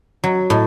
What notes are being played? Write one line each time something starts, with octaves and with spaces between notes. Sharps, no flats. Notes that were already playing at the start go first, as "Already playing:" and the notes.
F#3
A2